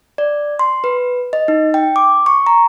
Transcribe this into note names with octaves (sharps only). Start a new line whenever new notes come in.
D5
C6
B4
D#5
D#4
G5
D6
C#6
A#5